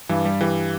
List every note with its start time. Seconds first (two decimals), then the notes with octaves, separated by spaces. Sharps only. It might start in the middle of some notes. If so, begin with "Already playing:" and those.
0.09 G2 E3
0.25 G3
0.41 E3 G4